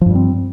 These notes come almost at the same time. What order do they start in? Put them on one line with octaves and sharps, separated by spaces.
F3 G2 G3 C4